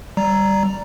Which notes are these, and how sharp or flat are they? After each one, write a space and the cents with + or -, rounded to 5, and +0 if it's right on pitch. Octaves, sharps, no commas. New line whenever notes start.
G3 +0 D5 +0 A#5 +0